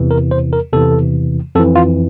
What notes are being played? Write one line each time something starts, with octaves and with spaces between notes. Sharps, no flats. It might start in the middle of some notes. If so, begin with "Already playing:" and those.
Already playing: E2 C3 E3
A#4
C5
A#4
E2 C3 E3 A4
F2 E3 A4
F4